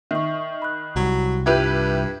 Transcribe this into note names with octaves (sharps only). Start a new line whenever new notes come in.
D#3 E5 C#6
B5 F#6
C2 F#3
G2 E4 F4 G4 B4